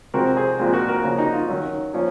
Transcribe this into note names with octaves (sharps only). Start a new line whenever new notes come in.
C3 F3 G#3 C4 F#4 A#4
G#4 C5
A#2 F3 G#3 C4
F#4 A#4
F#4 A#4
C#3 F3 A#3 C#4
D#4 F#4
F4
D#3 F#3 C#4
F3 A#3 C#4